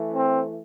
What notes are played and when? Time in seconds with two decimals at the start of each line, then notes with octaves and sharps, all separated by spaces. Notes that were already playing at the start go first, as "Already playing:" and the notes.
Already playing: E3 A3
0.15 C4